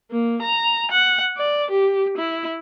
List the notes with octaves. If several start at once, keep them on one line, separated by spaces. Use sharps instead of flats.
A#3
A#5
F#5
D5
G4
E4